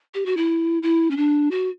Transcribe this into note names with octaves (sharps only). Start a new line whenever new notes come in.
G4
F#4
E4
E4
C#4
D4
F#4